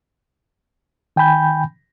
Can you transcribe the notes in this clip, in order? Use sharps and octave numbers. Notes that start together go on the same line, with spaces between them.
D#3 G5 G#5 B5 G6